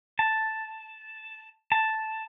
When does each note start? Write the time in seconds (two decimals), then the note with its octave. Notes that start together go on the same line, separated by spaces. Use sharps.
0.19 A5
1.72 A5